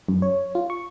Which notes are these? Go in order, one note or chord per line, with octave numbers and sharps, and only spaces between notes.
F#2
C#5
F4
C#6